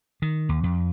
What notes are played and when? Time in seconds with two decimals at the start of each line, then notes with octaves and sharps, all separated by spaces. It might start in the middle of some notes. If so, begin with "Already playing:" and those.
0.22 D#3
0.49 D#2
0.63 F2